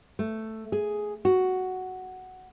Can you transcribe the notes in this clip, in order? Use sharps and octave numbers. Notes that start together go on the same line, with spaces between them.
A3
G#4
F#4